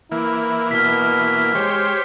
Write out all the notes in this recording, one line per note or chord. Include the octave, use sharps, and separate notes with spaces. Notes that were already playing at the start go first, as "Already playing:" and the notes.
E3 A#3 E4
B2 F6 B6
G#3 G4 C5 C#5